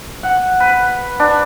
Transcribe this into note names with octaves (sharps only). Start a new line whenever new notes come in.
F#5
B4
D4